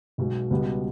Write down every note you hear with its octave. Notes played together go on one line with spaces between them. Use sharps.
B1 B2 G#3
C#2 B2 G3 B3